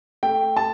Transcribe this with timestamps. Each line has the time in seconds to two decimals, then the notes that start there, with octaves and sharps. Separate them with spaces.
0.23 A3 G5
0.56 A5